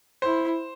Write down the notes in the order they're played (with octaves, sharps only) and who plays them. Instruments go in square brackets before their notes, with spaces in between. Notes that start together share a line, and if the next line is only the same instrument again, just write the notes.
[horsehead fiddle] E4 [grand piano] C5